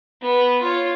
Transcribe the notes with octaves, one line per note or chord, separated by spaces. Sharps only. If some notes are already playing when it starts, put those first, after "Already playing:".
B3
F4 C#5